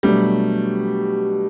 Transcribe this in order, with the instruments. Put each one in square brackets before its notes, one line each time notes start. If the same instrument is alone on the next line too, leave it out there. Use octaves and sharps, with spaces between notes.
[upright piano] B2 F#3 A3 D4 G4 [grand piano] G3